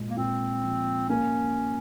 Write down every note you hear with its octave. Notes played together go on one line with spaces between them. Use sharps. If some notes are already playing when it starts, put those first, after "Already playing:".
Already playing: A#2 G#3
A#3
A#2 C4
F3
A#3 C#4